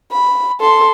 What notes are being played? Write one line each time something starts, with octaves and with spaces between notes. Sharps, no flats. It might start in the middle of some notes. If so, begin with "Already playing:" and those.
B5
A4 C6